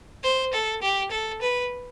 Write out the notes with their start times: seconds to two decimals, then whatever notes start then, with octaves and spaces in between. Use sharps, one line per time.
0.24 C5
0.53 A4
0.82 G4
1.11 A4
1.41 B4